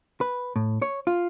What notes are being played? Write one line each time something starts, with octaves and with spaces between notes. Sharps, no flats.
B4
A2
C#5
F4